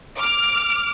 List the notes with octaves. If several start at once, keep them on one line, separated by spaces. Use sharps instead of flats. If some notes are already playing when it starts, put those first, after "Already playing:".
D6 F6